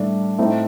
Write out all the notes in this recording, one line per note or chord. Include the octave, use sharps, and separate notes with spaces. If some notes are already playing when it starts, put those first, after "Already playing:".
Already playing: A2 G3 A3 D4
A2 A3 C4 D#4